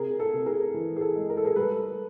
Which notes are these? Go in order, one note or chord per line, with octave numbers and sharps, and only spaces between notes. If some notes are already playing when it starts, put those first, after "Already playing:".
Already playing: C3 G#4 A#4
A4
C3
G#4 A#4
E3
G#4
A4
G#3
A#4
A4
G#4 A#4
G3 A4 B4